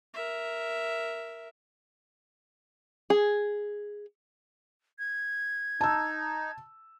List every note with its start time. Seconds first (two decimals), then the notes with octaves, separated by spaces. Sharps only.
0.14 A#4 E5
3.10 G#4
4.99 G#6
5.81 D#4 A5 E6